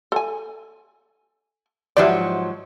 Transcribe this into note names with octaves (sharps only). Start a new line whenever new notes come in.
A4 G#5
G#2 F3 F#3 E4 G4 D5